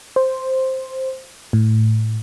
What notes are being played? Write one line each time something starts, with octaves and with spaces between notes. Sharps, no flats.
C5
A2